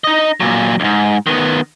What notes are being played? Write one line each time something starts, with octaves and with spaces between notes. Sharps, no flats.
D#4 D#5
A#2 F#3
D2 G#2
D#3 B3